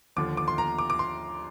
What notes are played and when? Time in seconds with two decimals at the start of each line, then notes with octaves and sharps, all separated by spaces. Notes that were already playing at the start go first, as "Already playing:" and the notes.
0.16 D#2 D3 F3 D6
0.37 D6
0.48 C6
0.58 A#5
0.79 D6
0.90 D6
0.99 C6